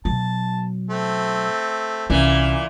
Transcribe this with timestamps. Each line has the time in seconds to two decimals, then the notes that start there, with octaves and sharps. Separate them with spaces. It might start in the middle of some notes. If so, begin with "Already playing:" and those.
0.05 B2 F#3 A5
0.90 A3 C4
2.10 C2 A#2 E3 C#4